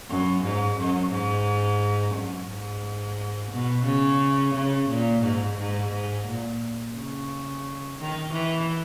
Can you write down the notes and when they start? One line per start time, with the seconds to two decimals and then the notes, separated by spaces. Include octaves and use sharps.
0.09 F#2
0.43 G#2
0.78 F#2
1.11 G#2
2.15 F#2
2.49 G#2
3.51 B2
3.85 C#3
4.54 C#3
4.89 A#2
5.23 G#2
5.58 G#2
5.92 G#2
6.27 A#2
6.94 C#3
7.98 D#3
8.33 E3